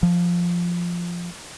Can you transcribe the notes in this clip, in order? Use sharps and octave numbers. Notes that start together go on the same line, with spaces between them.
F3